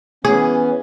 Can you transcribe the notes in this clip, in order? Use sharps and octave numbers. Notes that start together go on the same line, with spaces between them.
E3 B3 C#4 G#4